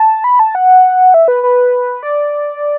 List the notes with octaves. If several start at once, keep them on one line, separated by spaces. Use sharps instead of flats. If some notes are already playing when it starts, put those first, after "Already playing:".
Already playing: A5
B5
A5
F#5
E5
B4
B4
D5